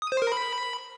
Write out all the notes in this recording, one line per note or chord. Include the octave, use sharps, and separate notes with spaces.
D#6
C5
A#4
B5